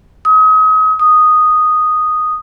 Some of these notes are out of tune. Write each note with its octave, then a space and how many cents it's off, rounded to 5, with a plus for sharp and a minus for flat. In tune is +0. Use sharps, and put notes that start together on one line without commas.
D#6 +35
D#6 -5